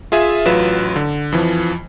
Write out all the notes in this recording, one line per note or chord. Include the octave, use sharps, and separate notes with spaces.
F4 G#4 E5 G#5
A1 F#3 F4 B4 E7
D3
F2 E3 F3